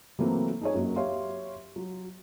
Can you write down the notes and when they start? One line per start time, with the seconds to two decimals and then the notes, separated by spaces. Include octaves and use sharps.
0.19 E3 F#3 A3 A#3 C4
0.61 D#4 G#4 C#5
0.74 F#2 F#3 A#3
0.96 G4 C#5 E5 F5 C6
1.76 F#3